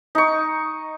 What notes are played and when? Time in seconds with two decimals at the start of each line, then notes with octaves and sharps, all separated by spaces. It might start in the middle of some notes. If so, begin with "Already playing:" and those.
0.15 D#4 C#6